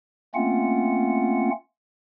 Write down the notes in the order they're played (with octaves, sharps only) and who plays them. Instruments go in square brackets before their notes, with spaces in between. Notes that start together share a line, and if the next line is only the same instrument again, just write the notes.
[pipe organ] A3 A#3 C4 C#4 F4 F#5